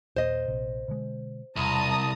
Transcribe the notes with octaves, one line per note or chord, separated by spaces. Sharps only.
D#1 A#2 C5 D#5
A#1 C3
B2 D3 G#3
E1 C2 A5 A#5 D#6